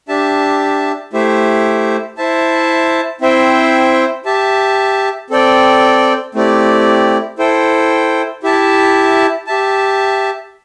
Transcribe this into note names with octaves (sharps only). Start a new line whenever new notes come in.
D4 G4 E5 A5
A3 E4 G4 C5 E5
E4 C5 E5 A5
C4 E4 C5 E5 G5
G4 E5 A5
C4 A4 D5 G5
A3 C4 E4 G4 D5
E4 A4 C5 G5
E4 G4 E5 A5
G4 E5 A5